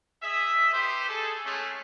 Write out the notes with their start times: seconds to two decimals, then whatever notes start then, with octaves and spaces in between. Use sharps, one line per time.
0.22 G#4 D#5 E5
0.73 D#4 G4 B4 C5
1.08 G#4 A4
1.45 G#3 A3 C#4 G#4